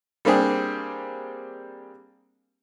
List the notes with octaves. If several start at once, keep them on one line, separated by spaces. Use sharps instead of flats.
G3 A#3 C4 D4 G4 G#4